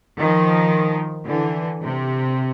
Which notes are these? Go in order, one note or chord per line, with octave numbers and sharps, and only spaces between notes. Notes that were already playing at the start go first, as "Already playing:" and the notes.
D#3 F3
D3 E3
C3